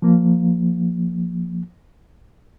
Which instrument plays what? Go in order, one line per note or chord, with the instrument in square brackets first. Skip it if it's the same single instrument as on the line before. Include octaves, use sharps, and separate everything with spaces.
[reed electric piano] F3 A#3